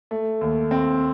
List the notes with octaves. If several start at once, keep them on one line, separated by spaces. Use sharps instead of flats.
A3
D#2
C4